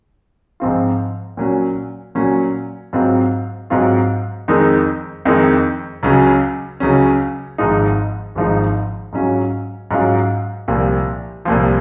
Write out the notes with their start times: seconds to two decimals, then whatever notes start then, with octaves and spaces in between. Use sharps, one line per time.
0.60 G#2 F3 C4 F4
1.37 A#2 F#3 C#4
2.15 A#2 F#3 C#4
2.93 G#2 F#3 C4 F4
3.70 G#2 F#3 C4 F4
4.48 F2 D#3 G#3 D#4
5.25 F2 D#3 G#3 D#4
6.03 C#2 C#3 F#3 C#4
6.80 C#2 C#3 F#3 C#4
7.58 G#1 G#2 F3 G#3 D#4
8.35 G#1 G#2 F3 G#3 D#4
9.13 G#2 F#3 C#4 F4
9.91 G#2 F#3 C#4 F4
10.68 C2 A#2 F3
11.45 C2 A#2 F3